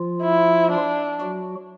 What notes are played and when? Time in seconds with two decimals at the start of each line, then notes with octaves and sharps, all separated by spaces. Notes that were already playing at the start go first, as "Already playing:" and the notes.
Already playing: F3 F4
0.22 E4
0.71 D4
1.21 F#3 F#4